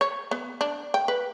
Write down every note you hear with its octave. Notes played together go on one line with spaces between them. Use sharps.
C#5
B3
D4
G5
B4